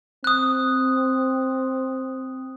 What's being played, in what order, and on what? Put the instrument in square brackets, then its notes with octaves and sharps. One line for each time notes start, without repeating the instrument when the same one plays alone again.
[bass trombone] C4 [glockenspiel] D#6 F#6